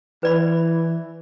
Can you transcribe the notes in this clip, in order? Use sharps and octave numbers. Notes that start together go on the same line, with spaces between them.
E3 B4 D5 B5